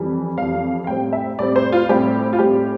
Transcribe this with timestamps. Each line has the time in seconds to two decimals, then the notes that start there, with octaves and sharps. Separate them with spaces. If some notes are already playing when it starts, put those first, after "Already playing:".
Already playing: F2 E3 G3
0.38 F2 E3 G3 F5
0.84 F5
0.87 A2 G3 C4 G5
1.13 E5
1.38 A2 G3 C4 D5
1.56 C5
1.72 F4
1.89 A2 G3 C4 G4
2.33 F4
2.39 A2 G3 C4 G4